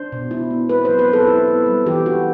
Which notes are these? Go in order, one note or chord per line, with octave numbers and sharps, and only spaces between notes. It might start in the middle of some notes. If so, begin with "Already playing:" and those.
Already playing: D4 C5
B2
E4
B3
C4 B4
F#3 C5
B4
C4 A4
E4
B3
G3
E3 G4
D4 F#4